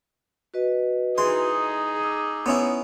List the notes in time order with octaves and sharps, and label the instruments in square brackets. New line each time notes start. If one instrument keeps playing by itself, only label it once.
[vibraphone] F#4 B4 D#5
[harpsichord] E3 C6 [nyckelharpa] D#4 G#4
[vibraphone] D6 E6
[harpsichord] B3 C#4 E4